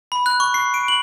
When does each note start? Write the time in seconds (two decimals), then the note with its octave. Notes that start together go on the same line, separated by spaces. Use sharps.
0.12 B5
0.26 F#6
0.40 C#6
0.54 C7
0.74 D7
0.88 F#7